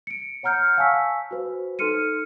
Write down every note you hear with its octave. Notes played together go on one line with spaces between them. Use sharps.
C#7 D7
C#5 F#5 A#5 F6 G6 C#7
F5 G#5 A5 C#6 E6 B6
F#4 B4 C5
D#4 A4 C6 F6 C#7 D#7